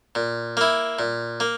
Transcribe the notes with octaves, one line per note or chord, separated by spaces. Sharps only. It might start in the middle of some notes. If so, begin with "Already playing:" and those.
A#2
A#3 E4
A#2
A#3